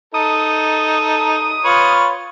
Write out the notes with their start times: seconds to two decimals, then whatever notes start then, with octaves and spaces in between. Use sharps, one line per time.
0.14 D#4 A4 D#6
1.65 F4 B4 C#5